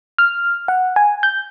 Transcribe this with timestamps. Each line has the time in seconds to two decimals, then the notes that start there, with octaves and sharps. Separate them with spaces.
0.18 F6
0.68 F#5
0.96 G#5
1.23 G6